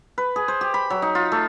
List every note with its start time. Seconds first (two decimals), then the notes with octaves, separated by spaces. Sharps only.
0.18 B4
0.36 G#4
0.48 C5
0.61 G4
0.74 B5
0.90 F#3
1.02 D#4
1.15 F4
1.32 A3